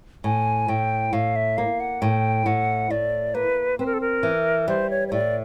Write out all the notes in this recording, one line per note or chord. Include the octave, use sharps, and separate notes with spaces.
A2 G#5
A2 G5
A2 F5
E5
A#3 F5
F#5
A2 G5
A2 F#5
A2 D5
A#3 B4
C4 B4
A#4
A4
A#4
E3
G3 C5
C#5
C#5
A2 D5